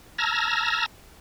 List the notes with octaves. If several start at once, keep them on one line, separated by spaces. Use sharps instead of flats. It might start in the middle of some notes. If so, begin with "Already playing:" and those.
A5 A#5 E6 F6 G#6 A#6